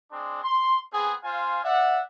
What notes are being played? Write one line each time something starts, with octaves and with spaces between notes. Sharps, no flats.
G#3 C4 D4
C6
B3 C4 G#4
F4 C5 F5 G#5
D5 E5 F#5